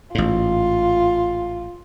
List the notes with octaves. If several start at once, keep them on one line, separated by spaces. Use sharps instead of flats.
A1 G#2 F4